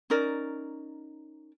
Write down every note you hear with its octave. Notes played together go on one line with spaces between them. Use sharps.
C#4 D#4 A#4 D5